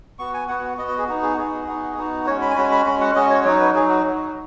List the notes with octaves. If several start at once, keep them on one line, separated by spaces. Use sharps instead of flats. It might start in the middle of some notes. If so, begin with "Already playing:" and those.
B3 F#4 C#6
G#5
B3 F#4 F#5
B3 F#4 D#5
D#5
G#4
B3 D#4 F#4
G#4
B3 D#4 F#4 G#4
B3 D#4 F#4
B3 D#4 F#4
G#3 C#4 F#4 C#5
B5
G#5
G#3 C#4 F#4 B5
B5
G#3 C#4 F#4 B5
F#5
G#3 C#4 F#4 D#5
C#5
F#3 D#4 F#4 C#5
B4
F#3 D#4 F#4 G#4
F#4
F#3 D#4 F#4